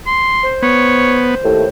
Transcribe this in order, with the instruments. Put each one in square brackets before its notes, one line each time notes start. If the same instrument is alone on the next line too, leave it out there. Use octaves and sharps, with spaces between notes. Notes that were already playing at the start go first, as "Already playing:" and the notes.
[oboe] C6
[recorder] C5
[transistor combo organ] B3 [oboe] C#5
[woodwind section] D#2 A2